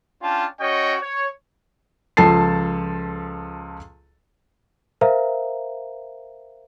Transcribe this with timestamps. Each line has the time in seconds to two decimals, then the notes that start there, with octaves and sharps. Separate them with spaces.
0.22 C#4 D4 F4 G5 A5
0.60 C#4 F#4 C#5 D#5 G5
1.02 C#5
2.17 C#2 F3 A4 A5 A6 C7
5.01 A#4 C5 E5 F5 A#5